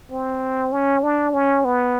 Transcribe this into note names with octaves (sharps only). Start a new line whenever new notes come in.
C4
C#4
D4
C#4
B3